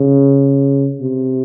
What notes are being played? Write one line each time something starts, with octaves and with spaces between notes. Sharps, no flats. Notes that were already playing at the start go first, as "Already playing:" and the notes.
Already playing: C#3
C3